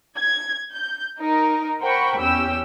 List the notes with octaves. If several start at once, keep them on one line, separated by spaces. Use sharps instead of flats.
G#6
G6
D#4 A#4
A#4 C5 F#5 G5 B5 C#6
E2 C#4 G4 G5 E6